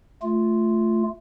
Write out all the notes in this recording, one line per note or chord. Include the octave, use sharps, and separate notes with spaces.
A3 F4